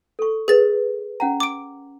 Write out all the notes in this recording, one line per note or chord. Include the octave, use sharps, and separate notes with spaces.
A4 C#6
G#4 A#4 B4 A6
C#4 F#5 A#5
D6 D7